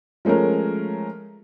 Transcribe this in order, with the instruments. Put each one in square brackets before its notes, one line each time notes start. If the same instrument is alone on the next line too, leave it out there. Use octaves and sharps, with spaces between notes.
[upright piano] F3 G#3 A3 C#4 A#4